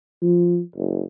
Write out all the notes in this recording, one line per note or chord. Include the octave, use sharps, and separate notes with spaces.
F3
F#1